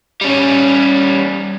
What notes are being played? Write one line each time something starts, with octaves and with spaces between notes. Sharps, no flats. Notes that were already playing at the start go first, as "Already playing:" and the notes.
G3 C#4